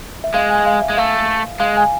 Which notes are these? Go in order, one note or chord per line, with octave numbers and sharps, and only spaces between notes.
E5
G#3 F5
G#5
F5
E5
G#3
A3 F5
G#3 F5
G#5